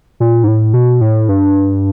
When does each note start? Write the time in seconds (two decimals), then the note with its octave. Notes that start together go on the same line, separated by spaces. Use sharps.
0.20 A#2
0.44 G#2
0.48 A2
0.74 B2
1.01 A2
1.29 G2